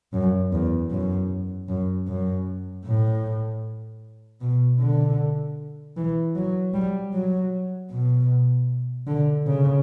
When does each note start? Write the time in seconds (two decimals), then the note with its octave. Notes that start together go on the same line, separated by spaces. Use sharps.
0.13 F#2
0.52 E2
0.91 F#2
1.69 F#2
2.08 F#2
2.85 A2
4.41 B2
4.80 D3
5.97 E3
6.35 F#3
6.74 G3
7.13 F#3
7.91 B2
9.07 D3
9.46 C#3